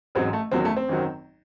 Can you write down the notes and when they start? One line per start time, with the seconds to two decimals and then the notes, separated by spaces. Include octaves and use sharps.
0.15 A1 G#2 F#3 C4
0.33 A3
0.52 F#1 E2 D#3 F#3 C4
0.65 A3
0.76 C4
0.89 G#1 F#2 D#3 F#3